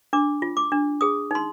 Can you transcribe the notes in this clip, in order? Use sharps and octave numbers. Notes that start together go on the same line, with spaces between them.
D4 D6
F4
D6
D4
G#4 D#6
D#4 C6